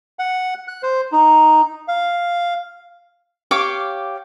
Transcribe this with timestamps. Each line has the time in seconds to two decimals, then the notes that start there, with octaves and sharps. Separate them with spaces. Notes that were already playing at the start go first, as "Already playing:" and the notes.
0.19 F#5
0.68 F#6
0.83 C5
1.12 D#4
1.88 F5
3.51 G4 C#5 F5 D6